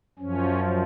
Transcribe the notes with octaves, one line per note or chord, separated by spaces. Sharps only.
F#2 F3 C#4